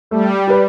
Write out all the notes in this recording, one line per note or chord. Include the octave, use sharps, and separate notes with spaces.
G3 A3
G4 B4 D5